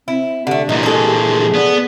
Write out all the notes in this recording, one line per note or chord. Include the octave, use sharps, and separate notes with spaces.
C4 E4
D3 A3 G4
A#2 E3 D#4
G#4 A4
B3 D5